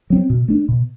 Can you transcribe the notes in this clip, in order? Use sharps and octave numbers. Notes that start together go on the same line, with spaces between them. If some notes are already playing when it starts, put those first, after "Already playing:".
F#3 C4
B2
A3 D4
B2